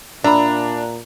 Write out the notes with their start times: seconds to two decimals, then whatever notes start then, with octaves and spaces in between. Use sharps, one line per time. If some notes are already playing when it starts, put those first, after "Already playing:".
0.24 A#2 D4 E5 A#5 B5